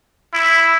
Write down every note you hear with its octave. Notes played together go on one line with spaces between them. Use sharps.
E4